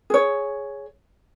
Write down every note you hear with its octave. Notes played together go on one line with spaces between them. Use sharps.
G#4 C#5